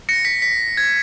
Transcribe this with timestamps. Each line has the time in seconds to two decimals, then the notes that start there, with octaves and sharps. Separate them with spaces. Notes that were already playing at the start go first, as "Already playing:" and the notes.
0.09 A#6 C#7
0.25 B6
0.42 B6
0.77 G#6